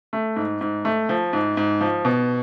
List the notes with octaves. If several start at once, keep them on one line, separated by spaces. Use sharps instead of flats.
A3
G#2
G#2
A3
F3
G#2
G#2
F3
B2